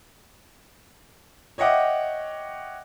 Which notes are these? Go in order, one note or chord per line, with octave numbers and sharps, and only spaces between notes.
C#5 D#5 E5 F#5 G5 D6